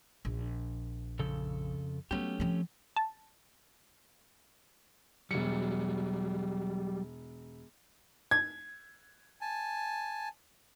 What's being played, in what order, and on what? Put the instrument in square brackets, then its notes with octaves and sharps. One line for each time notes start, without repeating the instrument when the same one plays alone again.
[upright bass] A#1
[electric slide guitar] F2 C#3 A4
[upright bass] F#3 B3 [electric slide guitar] A3 C#4 G4
[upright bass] F3 C4
[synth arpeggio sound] A5
[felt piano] E1 C#7 [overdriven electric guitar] F#3 G3
[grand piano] G#6
[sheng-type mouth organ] G#5 A5